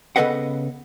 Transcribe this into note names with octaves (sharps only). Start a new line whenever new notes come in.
C#3 B3 A4 B4 D#5 F#5